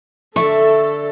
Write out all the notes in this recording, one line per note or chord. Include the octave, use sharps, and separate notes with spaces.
D3 A4 D5 E5 C#6